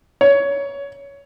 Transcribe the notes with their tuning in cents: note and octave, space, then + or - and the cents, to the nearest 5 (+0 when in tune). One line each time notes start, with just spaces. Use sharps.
C#5 +15